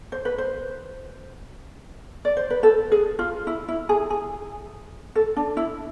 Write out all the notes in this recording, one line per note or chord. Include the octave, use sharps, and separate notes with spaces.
C5
B4
C5
D5
C5
B4
A4
G#4
F4
E4
E4
G#4
G#4
A4
D4
E4